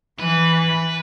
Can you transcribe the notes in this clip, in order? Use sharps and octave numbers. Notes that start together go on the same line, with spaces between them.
E3 B4